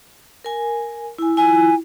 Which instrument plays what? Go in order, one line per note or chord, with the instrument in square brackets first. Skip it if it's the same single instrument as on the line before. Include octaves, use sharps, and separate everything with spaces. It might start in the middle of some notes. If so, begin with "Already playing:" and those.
[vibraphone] A#4 G#5
E4 G#5
[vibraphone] E4 F4 [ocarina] G#5